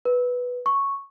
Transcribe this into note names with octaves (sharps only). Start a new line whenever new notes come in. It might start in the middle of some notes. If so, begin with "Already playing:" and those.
B4
C#6